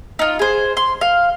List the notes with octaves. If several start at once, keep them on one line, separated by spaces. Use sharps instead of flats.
D#4 F4
G#4 C5
C6
F5